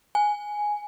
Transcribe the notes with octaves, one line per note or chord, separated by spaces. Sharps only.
G#5